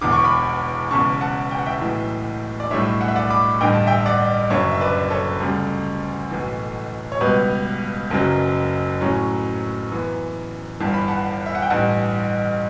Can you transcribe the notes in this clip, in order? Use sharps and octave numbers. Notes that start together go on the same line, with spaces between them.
E1 E2 D3 D6
C#6
B5 D6
E1 E2 C#3 A5 C#6
F#5 A5
G5
F#5
E5 G5
B1 A2 E3
D5
B1 A2 G3 D4 C#5 E5
F#5
E5
D5 F#5
B5 D6
A1 G2 D3 G5
A5
E5 G5
D5 F#5
F#1 F#2 D3 C#5 E5
E5
B4 D5
A4 C#5
D2 C#3 G3
B1 A2 E3
C#5
C#2 B2 G3 B3 B4
F#1 F#2 C#3 F#3
A2 F#3 C#4
F#2 E3 B3
G1 G2 E3 A5
B5
F#5 A5
E5
F#5
G5
A1 G2 E3 F#5 A5